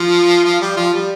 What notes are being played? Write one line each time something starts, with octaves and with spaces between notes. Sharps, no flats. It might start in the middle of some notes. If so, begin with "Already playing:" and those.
Already playing: F3 F4
F3 F4
G3 G4
F3 F4
G3